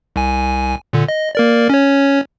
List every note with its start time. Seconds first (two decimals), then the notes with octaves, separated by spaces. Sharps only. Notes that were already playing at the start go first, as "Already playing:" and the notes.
0.16 C2 G#5
0.93 A#2 D3
1.08 D#5
1.35 A#3 A#4 D5
1.70 C#4 C#5